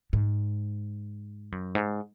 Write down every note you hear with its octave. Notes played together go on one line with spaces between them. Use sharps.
G#2
F#2
G#2